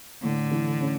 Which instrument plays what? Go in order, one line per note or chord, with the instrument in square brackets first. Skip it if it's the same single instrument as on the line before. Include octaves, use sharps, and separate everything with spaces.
[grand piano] A2 [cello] D3
[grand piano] E3
C#4